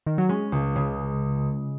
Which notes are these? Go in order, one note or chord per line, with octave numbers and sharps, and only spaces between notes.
D#3
F#3
G#3 C#4
C#2
C#3